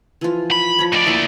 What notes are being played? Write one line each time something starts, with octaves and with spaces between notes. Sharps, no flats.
E3 F3 F4
B5
F3 C#5
D2 D5 D#5
A#3 E4 E5